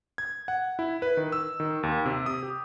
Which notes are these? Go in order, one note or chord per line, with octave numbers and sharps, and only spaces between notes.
G#6
F#5
E4
B4
D#3
E6
D#3
D#2
C3
D#6
G4